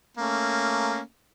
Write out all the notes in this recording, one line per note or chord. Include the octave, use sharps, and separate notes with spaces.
A3 A#3 C#4